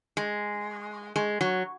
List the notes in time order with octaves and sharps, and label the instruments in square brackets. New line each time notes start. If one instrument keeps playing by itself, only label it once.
[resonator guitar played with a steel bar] G#3
G#3
F#3